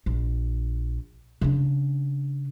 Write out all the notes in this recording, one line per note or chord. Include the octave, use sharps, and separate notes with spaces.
A#1
C#3 D4